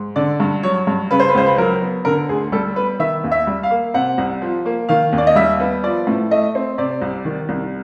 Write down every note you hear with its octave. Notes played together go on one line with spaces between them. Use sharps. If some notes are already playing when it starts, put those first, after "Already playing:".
Already playing: G#2
D3 D5
G2
F#3 C#5
G2
C#3 B4
C5
B4
C#2 C5
B4
F#3 A#4
B3
D3 A#4
D2 G#4
G3 A4
B3 B4
D#3 E5
D#2
E5
G3
F5
A#3
C3 F#5
C2
F3
A#3
D#3 F5
D#2
D5
D#5
G3 E5
B3
F3 D5
A2
A3 D#5
C4
C3 D5
C2
D#3
C2